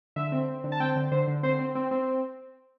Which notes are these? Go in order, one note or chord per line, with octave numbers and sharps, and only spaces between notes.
D3 E5
C4
C4
D3
A5
C4 G5
D3
D3 C5
D3
C4 C5
C4
C4
C4